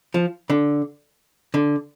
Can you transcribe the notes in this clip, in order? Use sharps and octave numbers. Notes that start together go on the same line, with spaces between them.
F3
D3
D3